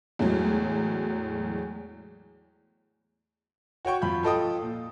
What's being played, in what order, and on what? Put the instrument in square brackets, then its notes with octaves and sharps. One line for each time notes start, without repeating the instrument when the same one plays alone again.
[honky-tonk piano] E2 A2 E3 F#3 G#3
[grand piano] F#4 C#5 G5 C#6
F2 F4 B5 G6
F4 A4 D#5 G5 D#6
A#2